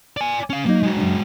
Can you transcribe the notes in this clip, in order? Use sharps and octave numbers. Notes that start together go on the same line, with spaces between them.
D5 G#5
C#4 F5
F#3 A#3 D#4
G#3 F#4
F#2 C#3 D4